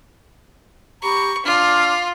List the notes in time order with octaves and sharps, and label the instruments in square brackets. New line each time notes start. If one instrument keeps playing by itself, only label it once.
[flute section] G4 A#5 B5 [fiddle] C#6
[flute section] D4 F6 [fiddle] F4